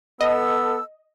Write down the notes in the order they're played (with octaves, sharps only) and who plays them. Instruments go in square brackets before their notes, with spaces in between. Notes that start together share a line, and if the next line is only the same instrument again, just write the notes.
[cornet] B3 [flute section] A4 E6 [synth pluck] D#5